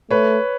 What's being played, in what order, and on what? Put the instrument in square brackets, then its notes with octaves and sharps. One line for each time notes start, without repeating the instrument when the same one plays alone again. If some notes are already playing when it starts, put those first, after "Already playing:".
[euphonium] A3 [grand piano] B4 C#5